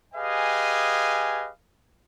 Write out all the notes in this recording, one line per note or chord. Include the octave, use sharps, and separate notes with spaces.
G4 G#4 B4 D#5 F5 G#5